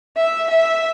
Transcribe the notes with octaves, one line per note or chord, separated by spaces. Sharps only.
E5
E5